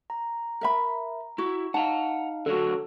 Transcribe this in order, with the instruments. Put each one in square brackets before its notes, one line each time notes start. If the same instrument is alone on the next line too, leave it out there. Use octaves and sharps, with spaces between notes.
[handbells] A#5
[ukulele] A#4 E5 B5
[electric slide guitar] E4 [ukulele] F#4
[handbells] D#4 F5 [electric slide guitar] F#5 A#5 [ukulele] A5
[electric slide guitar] D3 F#3 F#4 [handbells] A4